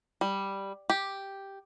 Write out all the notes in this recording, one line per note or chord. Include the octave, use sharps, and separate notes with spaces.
G3
G4